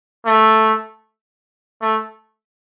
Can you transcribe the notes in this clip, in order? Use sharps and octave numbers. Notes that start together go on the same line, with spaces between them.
A3
A3